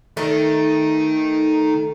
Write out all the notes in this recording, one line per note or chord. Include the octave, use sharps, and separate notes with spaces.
D#3 A3